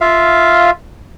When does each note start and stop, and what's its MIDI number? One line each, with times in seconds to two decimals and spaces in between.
0.01 0.71 65
0.01 0.71 76
0.01 0.71 77